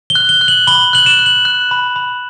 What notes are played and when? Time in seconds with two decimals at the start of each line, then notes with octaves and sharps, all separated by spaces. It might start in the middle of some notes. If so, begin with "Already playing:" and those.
0.10 G7
0.15 F#6
0.29 G7
0.41 F#6
0.48 F#7
0.67 B5 G7
0.93 F#6 F#7
1.06 E7
1.19 F#6
1.26 F#7
1.45 F#6
1.71 B5
1.96 B5